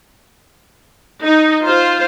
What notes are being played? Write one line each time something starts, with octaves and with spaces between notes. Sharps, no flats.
D#4
F4 C5